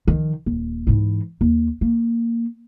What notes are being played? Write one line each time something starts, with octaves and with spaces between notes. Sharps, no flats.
D#3 F3
D#1
G#2 E3
D#2
A#3